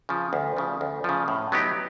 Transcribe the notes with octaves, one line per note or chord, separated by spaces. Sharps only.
C#3 F3
D2
C#3 F3
D2
C#3 F3
A2
F#3 B3 D#4 G4